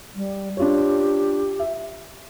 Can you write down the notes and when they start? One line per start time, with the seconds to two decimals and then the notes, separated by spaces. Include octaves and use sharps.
0.15 G3
0.57 D4 F4 G4 C#5
1.59 E5